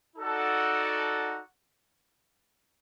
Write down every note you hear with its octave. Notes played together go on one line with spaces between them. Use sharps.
D#4 F#4 A4 D5 F#5